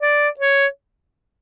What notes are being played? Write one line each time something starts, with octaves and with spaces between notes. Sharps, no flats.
D5
C#5